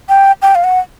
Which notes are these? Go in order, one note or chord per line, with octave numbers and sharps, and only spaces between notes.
G5
G5
F5
F#5